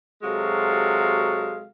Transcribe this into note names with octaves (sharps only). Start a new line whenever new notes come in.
C3 F#3 G#3 F#4 A4 F5